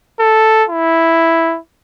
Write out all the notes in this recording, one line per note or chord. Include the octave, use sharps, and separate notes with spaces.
A4
E4